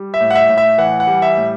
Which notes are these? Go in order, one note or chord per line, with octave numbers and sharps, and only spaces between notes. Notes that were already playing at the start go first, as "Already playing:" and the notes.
Already playing: G3
E5
A2
F#5
E5
A2
E5
E3 F#5
F#5
G3
E5
A2